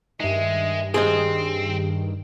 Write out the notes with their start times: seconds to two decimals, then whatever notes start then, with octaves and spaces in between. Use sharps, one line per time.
0.20 G2 D#3 G#3 E5
0.94 C4 G4 G#4 C5 D#5